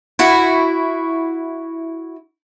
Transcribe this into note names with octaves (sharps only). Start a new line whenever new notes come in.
E4 F#4